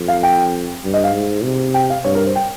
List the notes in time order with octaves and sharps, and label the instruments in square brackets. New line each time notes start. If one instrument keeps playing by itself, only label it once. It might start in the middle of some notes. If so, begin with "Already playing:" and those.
Already playing: [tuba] F2
[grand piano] F5
G5
[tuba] G2
[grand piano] D#5
F5
[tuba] G#2
C3
[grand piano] G5
F5
[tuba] G2 [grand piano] C#5
[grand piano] A#4
C5
G5